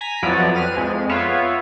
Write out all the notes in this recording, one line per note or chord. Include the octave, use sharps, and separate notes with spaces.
G#5 A#5 B6
F2 F3 F#3 B3 E4 D5
C4 B4 F6 D#7
F2 G#3
B3 F4 B4 C#5 E5 F5